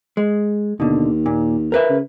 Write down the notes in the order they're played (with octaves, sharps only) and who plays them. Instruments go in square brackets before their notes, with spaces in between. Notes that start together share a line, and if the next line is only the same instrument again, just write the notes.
[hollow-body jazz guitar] G#3
[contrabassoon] D#2 [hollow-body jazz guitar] B2 D3
[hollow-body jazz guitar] A#2
A#4 B4 E5
[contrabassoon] C#3